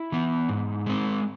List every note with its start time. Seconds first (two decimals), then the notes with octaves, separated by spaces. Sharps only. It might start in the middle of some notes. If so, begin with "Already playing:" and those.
Already playing: E4
0.12 E3 B3
0.49 G#2
0.86 G#3 C4